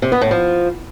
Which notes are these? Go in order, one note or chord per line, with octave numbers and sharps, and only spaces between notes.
C3
B3
A2
F3